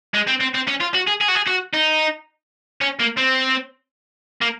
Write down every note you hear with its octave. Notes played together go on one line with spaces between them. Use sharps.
G#3
C4
C4
C4
C#4
F4
F#4
G#4
G#4
F#4
G#4
F#4
D#4
C#4
A#3
C4
A#3